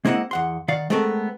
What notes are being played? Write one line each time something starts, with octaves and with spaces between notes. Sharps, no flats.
G#3 A#3 C4 E4 D#5 F#5
E2 F#5 C6
D#3 D5 F5 F#5
G#3 A3 B3 C4 A4 A#4